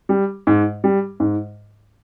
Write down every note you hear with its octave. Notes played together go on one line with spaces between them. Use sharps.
G3
G#2
G3
G#2